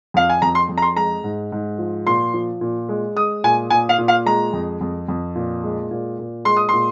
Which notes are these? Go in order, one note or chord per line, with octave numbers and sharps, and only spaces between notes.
F2 F5
G#5
F2 A#5
C6
F2
A#5
C6
G#3 A#5
G#2
G#2
F3
A#2 C6
F3
A#2
G#3
G#3 D#6
A#2 G#5
A#2 G#5
F5
A#2
F5
G#3 A#5
F2
F2
F2
A#2
G#3
A#2
A#2
G#3 C6
D#6
A#2 C6